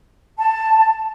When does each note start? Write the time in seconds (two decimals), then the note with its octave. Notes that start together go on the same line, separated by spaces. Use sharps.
0.38 A5